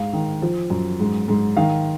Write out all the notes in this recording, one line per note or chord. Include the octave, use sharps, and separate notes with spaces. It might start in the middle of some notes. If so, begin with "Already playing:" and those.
Already playing: G#2 F5
D#3
F3
F#2
G#2
G#2
D#3 F5